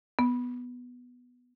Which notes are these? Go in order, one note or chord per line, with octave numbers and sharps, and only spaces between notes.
B3